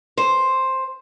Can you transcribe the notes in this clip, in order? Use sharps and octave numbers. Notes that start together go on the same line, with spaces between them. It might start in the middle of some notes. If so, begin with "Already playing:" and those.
C5